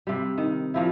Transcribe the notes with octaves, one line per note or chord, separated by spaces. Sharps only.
C3 G3
D#3
A#2 F3 E4